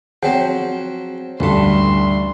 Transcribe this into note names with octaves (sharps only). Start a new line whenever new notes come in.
F3 F#3 C4 G#4 F#5 G5
A1 D2 G2 A3 C6